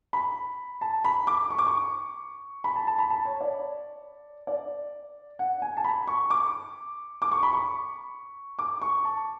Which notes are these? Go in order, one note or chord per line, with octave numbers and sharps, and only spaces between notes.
B5
A5
B5
D6
C#6
D6
C#6
B5
A5
A5
B5
A5
C#5
D5
D5
F#5
G#5
A5
B5
C#6
D6
D6
C#6
B5
C#6
D6
C#6
A5